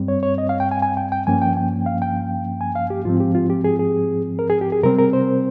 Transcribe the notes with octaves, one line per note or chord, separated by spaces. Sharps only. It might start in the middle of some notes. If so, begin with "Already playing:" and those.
Already playing: G2 G3 C4
C#5
C#5
D#5
F5
G5
G#5
G#5
G5
G5
G2 F3 A#3 C#4 G#5
G5
G5
F5
G5
G#5
F5
G4
G#2 F3 C4 F4
G4
F4
G4
G#4
G#4
A#4
G#4
G4
G#4
C3 G3 C4 A#4
A#4
C5